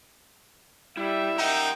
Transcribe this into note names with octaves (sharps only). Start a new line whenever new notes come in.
G3 E4 E5
D#4 A#4 F#5 G5 A#5